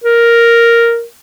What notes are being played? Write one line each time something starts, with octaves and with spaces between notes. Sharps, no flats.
A#4